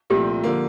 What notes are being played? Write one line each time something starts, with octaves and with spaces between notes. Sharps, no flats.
C2 A#2 F3 A3 C4 G4
D3 F3 A#3